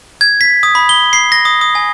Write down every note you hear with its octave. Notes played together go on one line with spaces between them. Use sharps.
G#6
B6
D#6
B5
G7
C7
A#6
D#6
D#6
G#5